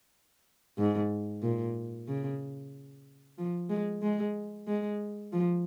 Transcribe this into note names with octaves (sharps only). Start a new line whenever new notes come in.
G#2
A#2
C#3
F3
G#3
G#3
G#3
F3